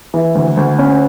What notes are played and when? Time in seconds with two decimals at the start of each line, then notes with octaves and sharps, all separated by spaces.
0.14 E3
0.35 D2
0.57 D2
0.79 C#4